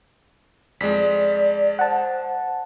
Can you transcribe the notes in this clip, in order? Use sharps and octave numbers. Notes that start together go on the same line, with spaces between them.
F2 G#3 D5 B6
C5 F#5 A5